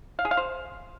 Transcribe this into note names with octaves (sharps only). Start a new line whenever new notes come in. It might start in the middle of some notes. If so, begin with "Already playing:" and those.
F5
G#4
F5
C5